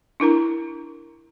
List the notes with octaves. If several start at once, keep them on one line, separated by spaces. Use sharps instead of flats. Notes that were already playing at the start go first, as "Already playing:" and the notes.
D4 E4 A#4 A#5